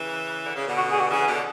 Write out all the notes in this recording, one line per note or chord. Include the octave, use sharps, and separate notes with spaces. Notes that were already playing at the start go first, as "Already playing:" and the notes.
Already playing: C#3 E3
D3
C#3
B2 D3
F#4
G#4
F#4
C#3 E3 G#4
B2 D3